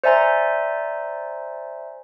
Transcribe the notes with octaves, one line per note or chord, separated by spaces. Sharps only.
C5 D5 E5 G#5 A#5 C6